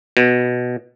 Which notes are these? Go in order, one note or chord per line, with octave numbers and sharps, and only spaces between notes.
B2